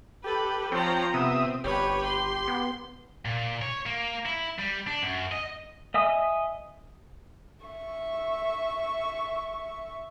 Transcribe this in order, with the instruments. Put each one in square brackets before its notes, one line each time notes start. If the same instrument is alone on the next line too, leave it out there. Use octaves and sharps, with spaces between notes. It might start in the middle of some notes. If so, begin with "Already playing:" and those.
[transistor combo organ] G4 [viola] A4 B4
[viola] F3 A#5 [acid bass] C4 [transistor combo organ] C5 C#5 G5
[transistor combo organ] C3 E5 D#6 [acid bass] B3 [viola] C4
[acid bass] G1 [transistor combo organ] G4 [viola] B4 C#5
[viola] C6
[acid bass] B3
[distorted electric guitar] A#2
C#5
A#3
E4
G3
D4
F#2
D#5
[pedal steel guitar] D#5 E5 G#5 D#6
[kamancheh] E5 C#6